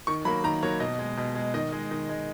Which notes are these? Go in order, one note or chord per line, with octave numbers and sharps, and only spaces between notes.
D#3 C#6
F#3 A#3 B5
D#3 A#5
F#3 A#3 C#5
B2 D#5
G#3
B2
G#3
D#3 D#5
G#3
D#3
G#3